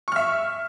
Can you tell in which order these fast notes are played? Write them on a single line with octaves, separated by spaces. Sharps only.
C#6 F6 E5